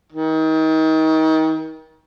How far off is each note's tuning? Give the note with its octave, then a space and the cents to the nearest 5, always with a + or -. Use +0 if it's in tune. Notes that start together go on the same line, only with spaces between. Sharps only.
D#3 +30